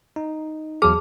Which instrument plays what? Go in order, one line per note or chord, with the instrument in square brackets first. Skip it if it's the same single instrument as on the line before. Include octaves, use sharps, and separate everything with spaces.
[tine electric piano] D#4
[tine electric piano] E2 F#3 F6 [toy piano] G#4 A5